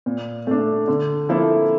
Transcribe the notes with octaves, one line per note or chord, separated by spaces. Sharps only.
A#2
A3 D4
D3
F3 A#3 E4 A4